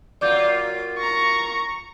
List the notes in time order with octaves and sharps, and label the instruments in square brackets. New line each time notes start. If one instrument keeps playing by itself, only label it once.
[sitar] F#3 A#3 F4 [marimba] D5 D6 G6
[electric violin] A#5 C#6